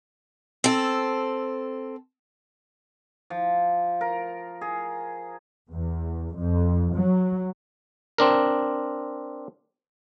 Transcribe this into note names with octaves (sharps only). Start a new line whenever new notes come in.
C4 A4
F3
A#4
G#4
E2
F2
F#3
C4 D4 A#4